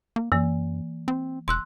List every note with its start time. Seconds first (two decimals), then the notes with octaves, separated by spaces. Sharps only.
0.16 A#3
0.32 F#2 E3 A#3
1.08 C4
1.48 E1 C6 E6 F#6